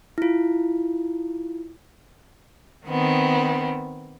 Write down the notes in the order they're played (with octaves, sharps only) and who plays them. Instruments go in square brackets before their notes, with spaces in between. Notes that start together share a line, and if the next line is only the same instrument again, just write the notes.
[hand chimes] E4 F4
[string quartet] D#3 B3 C4